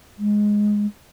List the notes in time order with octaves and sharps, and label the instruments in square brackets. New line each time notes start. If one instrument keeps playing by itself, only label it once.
[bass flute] G#3